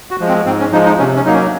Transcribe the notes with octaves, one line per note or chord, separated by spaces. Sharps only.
F#4
F3 G#3
C4
G#2 C4
C#4
F3 G#3 D#4
D#4
C3 C#4
C#4
F#3 A#3 D#4
C#4